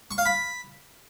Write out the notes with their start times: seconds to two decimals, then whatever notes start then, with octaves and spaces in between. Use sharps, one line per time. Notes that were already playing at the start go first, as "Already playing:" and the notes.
0.11 C#6
0.18 F5
0.25 B5